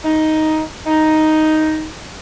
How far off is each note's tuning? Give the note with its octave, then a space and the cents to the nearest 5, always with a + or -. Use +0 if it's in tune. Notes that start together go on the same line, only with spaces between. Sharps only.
D#4 +5
D#4 +5